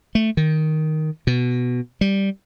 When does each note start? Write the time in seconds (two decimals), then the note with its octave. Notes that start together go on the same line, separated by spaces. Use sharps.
0.15 A3
0.37 D#3
1.27 B2
2.01 G3